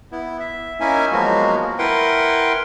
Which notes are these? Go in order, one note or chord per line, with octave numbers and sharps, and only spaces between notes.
B3 E4
E5
A#3 C#4 D#4 E4 E5 G#5
F3 F#3 G#3 A#3 B3 F#4
E4 A#4 B4 F#5 G5 C6